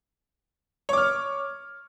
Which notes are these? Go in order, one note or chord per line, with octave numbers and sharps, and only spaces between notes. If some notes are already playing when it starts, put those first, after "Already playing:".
C#5 D6 F6